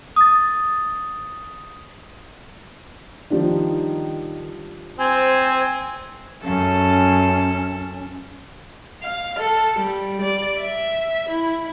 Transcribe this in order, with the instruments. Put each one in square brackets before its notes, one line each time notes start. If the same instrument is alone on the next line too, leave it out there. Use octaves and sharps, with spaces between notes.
[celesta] D#6 A6
[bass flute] D#3 [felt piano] F3 G3 D4
[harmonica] C4 [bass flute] C5 [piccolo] G#5
[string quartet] F#2 A4 [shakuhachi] C#4
[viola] F5
A4
G3
D5
E5
E4